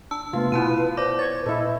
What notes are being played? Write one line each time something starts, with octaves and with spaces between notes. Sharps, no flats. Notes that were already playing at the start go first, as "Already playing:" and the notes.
D4 A5 E6
C3 A3 B3 F4 B4
B2 B3 E4 F4 A5 D#7
C5 D5 D6 G6 A#6
B4 C#5 A6
A#2 E4 A4 D#5